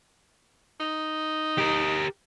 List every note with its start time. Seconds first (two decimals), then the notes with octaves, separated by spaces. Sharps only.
0.80 D#4
1.58 G4 A#4